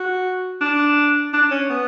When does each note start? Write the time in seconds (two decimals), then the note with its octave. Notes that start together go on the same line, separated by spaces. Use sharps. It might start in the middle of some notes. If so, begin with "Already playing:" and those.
Already playing: F#4
0.61 D4
1.33 D4
1.51 C#4
1.70 B3